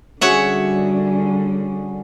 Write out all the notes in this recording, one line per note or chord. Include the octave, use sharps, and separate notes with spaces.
D3 G3 C#4 F#4 G#4 C#5 E5 F#5